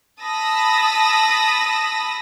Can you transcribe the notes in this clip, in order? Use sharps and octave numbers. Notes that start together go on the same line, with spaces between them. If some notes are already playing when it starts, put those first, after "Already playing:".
A5 B5 D#6 E6 A#6